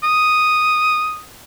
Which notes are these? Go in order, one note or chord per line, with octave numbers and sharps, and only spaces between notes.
D#6